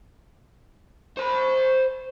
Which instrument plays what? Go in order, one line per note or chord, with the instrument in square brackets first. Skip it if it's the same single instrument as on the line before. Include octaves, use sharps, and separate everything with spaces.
[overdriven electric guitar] C5 B5